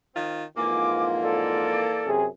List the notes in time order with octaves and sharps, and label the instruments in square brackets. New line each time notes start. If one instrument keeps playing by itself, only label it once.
[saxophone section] D#3 C4 F4
[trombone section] F2 G#2 F4 [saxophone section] E3 A#3 [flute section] G#5 D6
[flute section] A4 D5
[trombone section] F#2 C3 G#4